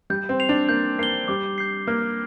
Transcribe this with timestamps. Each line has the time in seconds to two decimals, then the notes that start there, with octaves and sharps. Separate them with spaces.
0.10 G3 G6
0.29 C4
0.40 C7 F7
0.49 D4
0.69 A#3 G6
0.99 A#3 C7 G7
1.28 G3 D6
1.58 G6 C7
1.87 A#3 F6